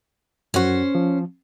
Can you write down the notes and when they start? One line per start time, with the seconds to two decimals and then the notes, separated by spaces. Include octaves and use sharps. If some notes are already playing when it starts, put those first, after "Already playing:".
0.54 F#2 C#4 F#4 C5
0.95 F3